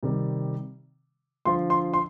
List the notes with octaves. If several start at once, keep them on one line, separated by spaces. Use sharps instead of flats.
C3 D#3 G3
D3 F3 C6
C6
C6